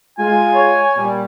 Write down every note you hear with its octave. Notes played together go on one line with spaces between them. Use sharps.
G#3 F4 G#5
C#5
A#2 G3